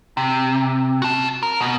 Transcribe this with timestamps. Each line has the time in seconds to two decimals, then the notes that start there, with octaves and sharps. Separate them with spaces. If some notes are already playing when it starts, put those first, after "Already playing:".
0.17 C3
1.02 F#4 A5
1.43 A#4
1.61 B2